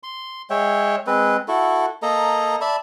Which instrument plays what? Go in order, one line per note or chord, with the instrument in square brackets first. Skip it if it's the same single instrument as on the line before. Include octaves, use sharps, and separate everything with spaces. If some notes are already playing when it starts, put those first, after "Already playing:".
[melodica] C6
G#3 C#5 E5 G5
G#3 C4 B4
E4 F#4 A4
A#3 A4 D#5 A#5
D5 E5 A5 B5